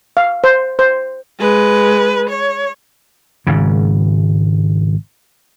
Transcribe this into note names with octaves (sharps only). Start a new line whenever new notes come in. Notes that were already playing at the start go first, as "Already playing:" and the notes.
F5
C5
C5
G#3 B4
C#5
G#1 G#2 C#3